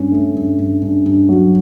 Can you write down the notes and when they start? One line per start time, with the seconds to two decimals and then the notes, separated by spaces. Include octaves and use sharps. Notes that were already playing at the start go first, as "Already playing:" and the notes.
Already playing: G2 C#4
0.12 A3
0.35 G2
0.59 G2
0.82 G2
1.06 G2
1.29 F#3